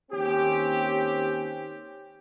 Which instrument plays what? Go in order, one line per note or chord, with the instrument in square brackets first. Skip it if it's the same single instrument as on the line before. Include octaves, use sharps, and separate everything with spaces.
[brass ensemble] D#2 C4 C#4 G4